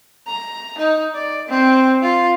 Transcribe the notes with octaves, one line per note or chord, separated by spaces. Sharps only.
A#5
D#4
D5
C4
F4